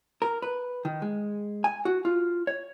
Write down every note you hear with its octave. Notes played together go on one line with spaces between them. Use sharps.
A#4
B4
D#3
G#3
G#5
F#4
F4
C#5